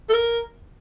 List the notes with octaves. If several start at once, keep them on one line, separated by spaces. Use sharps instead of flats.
A4
A#4